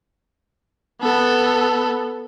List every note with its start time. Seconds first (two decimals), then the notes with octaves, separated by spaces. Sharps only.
1.01 B3 A4